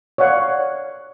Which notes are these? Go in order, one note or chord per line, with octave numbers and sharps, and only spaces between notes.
C#5 D5 F5 F#5